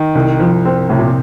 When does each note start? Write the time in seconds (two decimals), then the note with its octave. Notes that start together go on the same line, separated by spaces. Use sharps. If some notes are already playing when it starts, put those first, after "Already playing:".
Already playing: D#3
0.15 C2
0.40 F3
0.65 C4
0.89 A2 C3
0.99 A#2